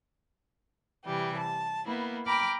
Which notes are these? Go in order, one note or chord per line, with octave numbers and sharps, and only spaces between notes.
C3 E3 G3 G4
A5
A#3 B3 E4
G5 A#5 B5 D6 F6